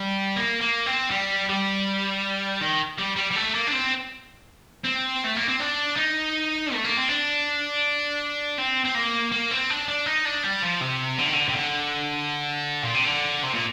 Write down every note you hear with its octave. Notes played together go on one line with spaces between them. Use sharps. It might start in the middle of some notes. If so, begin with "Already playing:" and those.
Already playing: G3
A#3
A#3
C4
G3
G3
D#3
G3
G3
G3
A3
A#3
D4
C4
C4
A3
A#3
C4
D4
D#4
A3
A#3
C4
D4
C4
C4
A#3
A#3
C4
D4
D4
D#4
D4
G3
F3
C3
D3
D#3
D3
C3
D3
A#2
C3
D3
C3
A#2